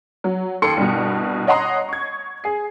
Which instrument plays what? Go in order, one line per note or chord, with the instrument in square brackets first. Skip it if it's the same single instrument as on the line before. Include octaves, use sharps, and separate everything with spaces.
[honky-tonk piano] F#3
D#2 A4 C6 C#7
C2 G2 B2
C#5 D#5 F#5 A#5 C6 D#6
C#6 G#6
G#4 C7